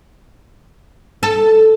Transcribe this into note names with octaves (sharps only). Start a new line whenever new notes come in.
A4